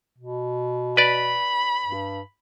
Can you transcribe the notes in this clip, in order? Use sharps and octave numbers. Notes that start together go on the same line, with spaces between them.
B2
B4 D5 B5
G2